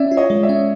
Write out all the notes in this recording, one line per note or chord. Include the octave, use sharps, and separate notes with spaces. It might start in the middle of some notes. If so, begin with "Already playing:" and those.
Already playing: C#4 D5 E5
F4
C#5 D#5
G#3
D5 E5
C#4